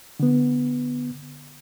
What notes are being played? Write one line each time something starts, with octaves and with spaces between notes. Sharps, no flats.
D3 B3